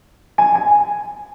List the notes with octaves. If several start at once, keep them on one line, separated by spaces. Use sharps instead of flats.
G#5
G#5